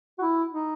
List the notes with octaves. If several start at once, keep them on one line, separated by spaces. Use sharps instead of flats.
F#4
E4
D#4